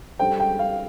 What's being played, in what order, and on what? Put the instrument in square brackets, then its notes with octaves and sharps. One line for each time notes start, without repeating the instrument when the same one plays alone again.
[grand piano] G3 D4 A4 C5 [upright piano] G5
[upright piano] G5
F5